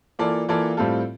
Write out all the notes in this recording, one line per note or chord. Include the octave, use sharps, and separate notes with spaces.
E3 A#3 F4 A4 D5
E3 A#3 F4 A4 D5
A2 G3 C4 F4 A4